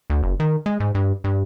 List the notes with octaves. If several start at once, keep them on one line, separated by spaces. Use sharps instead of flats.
D2
F#1
D#3
G#3
G#2
G2
G2